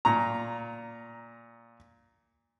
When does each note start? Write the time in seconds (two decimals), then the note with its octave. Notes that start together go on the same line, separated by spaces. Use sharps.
0.05 A#2 A#5